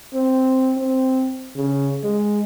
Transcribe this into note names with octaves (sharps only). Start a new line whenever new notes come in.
C4
C4
C#3
G#3